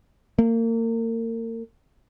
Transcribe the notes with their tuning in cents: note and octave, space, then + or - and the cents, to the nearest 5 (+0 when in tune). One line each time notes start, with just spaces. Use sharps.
A#3 -35